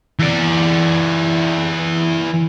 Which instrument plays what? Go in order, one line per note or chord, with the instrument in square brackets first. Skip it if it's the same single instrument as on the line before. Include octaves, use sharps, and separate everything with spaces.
[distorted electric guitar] E3 D5